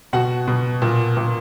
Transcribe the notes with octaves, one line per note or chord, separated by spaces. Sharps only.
B2 F#4 F#5
B2
A#2
A#2